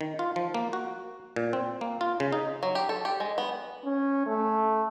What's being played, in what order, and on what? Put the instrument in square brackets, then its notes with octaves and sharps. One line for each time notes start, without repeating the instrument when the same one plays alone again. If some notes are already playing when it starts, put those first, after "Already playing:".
[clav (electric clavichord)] D#3
F4
F3
A#3
F#4
A#2
C4
A#3
F4
C#3
D#4
[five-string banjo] F#3
G4
A4
G4
G#3
B3
[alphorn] C#4
A3